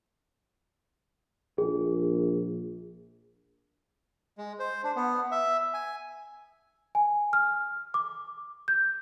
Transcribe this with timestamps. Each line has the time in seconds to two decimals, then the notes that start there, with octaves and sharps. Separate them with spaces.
1.58 A#1 G#4
4.38 G#3
4.59 C5
4.84 D4
4.96 B3
5.32 E5
5.74 G#5
6.95 G#5
7.33 F6
7.94 D6
8.68 G6